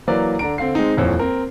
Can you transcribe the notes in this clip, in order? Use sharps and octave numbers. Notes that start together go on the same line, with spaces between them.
E3 F#3 A#3 B4 D5
D3 D4 A#5 D7
D3 C4 F5 C7
G#3 C4 D#4
D#1 F2 E3 C#5
C4 A#4